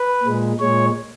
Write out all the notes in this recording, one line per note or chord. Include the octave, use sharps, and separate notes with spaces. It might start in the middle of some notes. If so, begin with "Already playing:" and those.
Already playing: B4
A#2 G#3
A#2 G#3 C#5